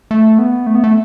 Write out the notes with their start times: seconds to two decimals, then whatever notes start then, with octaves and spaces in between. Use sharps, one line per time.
0.11 A3
0.38 B3
0.67 A3
0.75 B3
0.84 A3